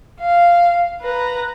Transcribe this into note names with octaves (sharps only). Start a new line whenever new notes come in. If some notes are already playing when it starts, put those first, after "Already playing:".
F5
B4 A#5